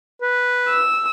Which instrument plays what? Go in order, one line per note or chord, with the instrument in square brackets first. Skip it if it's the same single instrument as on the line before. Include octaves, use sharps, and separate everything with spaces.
[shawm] B4
[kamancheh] E6